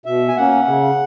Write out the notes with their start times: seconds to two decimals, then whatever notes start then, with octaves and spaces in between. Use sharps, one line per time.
0.06 B2 E5
0.28 G#5
0.36 A#3 C#4 F#5
0.66 C#3